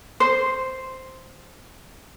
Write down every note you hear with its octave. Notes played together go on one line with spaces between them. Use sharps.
C5